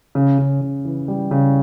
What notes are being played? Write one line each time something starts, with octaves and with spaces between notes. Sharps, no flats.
C#3
C#3
C#3
E3
G3
C#3